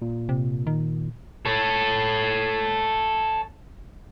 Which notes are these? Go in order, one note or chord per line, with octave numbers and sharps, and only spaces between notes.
A#2
C3
D#3
A4 C#5